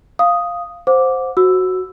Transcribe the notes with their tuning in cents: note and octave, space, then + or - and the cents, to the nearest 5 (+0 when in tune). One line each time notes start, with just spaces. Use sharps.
F5 +0 D#6 +0
C5 +0 F#5 -35 D6 -5
F#4 +0 E6 +0